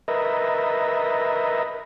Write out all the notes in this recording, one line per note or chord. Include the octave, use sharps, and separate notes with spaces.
A#4 B4 D#5 E5